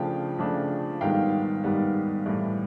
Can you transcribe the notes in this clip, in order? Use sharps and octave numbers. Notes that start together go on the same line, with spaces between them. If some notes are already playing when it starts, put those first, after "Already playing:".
Already playing: C#3 F3 A3 D4 F5 G5
C#3 F3 A3 D4
G#2 D#3 G3 B3 F5 G5
G#2 D#3 G3 B3
A2 E3 G3